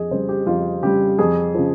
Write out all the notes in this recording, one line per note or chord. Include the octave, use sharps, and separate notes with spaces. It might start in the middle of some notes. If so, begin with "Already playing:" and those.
Already playing: F2 G#4 D#5
C#3 G3 C5
G4
F2 F4
C#3 G3 G4
F2 G#4
C#3 F3